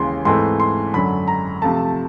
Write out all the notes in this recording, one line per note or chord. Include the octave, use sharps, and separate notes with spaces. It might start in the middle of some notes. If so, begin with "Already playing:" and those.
Already playing: D#2 C#3 E3 G#3 C6
G#2 E3 A3 C4 C6
C6
F#2 D3 F#3 B5
A#5
C3 F3 A3 A5